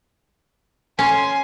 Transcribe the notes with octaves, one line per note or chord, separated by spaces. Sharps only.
C#4 G#5 C6